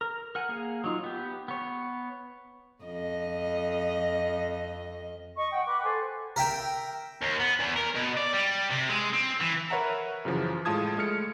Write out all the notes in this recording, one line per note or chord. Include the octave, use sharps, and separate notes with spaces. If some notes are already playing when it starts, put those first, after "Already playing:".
A#4
A#4 F#5 G#5
A#3 G#4 F5
F#3 D#4 F4
B3 G4
B3 C#5
F2 D#5
D#5 C#6
F#5 G5
B4 D6 F#6
A4 C5 G#5
A#4 E5 G5
D#2
B3
E2
A#4
B2
D5
G3
C3
G#3
C4
E3
A#4 B4 C#5 E5 F#5 A#5
F#2 C#3 E3 F3
A2 G#3 F4 A5 D#6 G#6
G#3 A3 F6 C#7